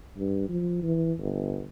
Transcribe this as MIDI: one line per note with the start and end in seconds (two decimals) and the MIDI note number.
0.18 0.46 43
0.49 0.80 53
0.83 1.13 52
1.19 1.65 31